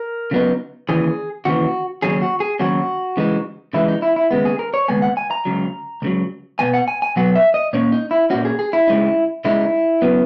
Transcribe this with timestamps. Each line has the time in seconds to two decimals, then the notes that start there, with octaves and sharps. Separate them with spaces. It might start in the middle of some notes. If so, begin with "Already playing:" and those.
Already playing: A#4
0.31 C#3 F#3 B3 D#4
0.89 D#2 C#3 E3 G#4
1.45 D#2 C#3 E3 F#4
2.02 D#2 C#3 F#3 C#4 G#4
2.22 F#4
2.40 G#4
2.59 D#2 C#3 F#3 C#4 F#4
3.17 C#3 E3 G#3 D#4
3.73 C#3 E3 G#3 D#4 E4
3.88 D#4
4.02 E4
4.16 E4
4.31 D#2 C#3 G#3 B3
4.45 G#4
4.59 A#4
4.74 C#5
4.88 D#2 C#3 G#3 B3 G#5
5.02 F#5
5.17 G#5
5.31 A#5
5.45 C#2 C#3 F#3
6.02 C#2 C#3 F#3
6.59 B2 F#3 B3 G#5
6.74 F#5
6.88 G#5
7.02 G#5
7.16 B2 F#3 B3 F#5
7.36 E5
7.54 D#5
7.73 A#2 A#3 C#4 C#5
7.92 D#4
8.11 E4
8.30 A#2 A#3 C#4 F#4
8.45 G#4
8.59 G#4
8.73 E4
8.88 C#3 G#3 D#4
9.45 C#3 G#3 D#4 E4
10.02 C#3 F#3 B3